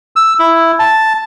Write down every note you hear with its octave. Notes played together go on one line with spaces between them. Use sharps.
E6
E4
A5